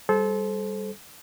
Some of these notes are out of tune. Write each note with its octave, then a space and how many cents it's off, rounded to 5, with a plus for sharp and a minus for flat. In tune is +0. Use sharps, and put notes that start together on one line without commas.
G3 +0 A4 -30 C5 +0